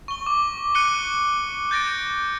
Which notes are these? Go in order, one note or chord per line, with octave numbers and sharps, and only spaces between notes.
C#6 G7
D6
F#6 C#7 D#7 G7
G6 A6 A#6 D7